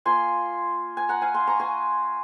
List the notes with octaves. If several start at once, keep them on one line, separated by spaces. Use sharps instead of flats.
A#3 F4 G#5 C6
G#5
F#5 A#5
F5 G#5
G#5 C6
A#5 C#6
G#5 C6